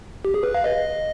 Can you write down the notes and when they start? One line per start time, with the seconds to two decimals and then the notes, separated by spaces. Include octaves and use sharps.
0.25 G4
0.34 G#4
0.43 B4
0.55 F5
0.64 D#5